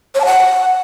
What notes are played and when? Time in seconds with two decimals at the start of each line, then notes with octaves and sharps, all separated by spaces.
0.15 C#5
0.20 A5
0.26 F#5